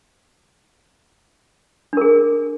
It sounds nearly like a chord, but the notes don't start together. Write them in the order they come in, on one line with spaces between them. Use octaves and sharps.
D4 A#4 G#4